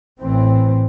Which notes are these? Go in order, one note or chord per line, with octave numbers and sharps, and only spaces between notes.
A1 A2 E3 C4